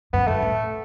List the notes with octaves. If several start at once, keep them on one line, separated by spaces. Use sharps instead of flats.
F#2 B3
F#2 A3
A2